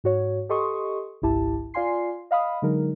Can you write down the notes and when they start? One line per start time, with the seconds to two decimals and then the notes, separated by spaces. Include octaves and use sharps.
0.04 G#2 F#4 C#5
0.49 G4 A4 D#5 C6 C#6 D#6
1.22 G#1 C#2 G#2 E4 G4 A5
1.74 F4 D5 F5 G#5 C6 C7
2.31 D#5 F5 B5 D#6
2.62 D3 F#3 G#3 D#4 A#4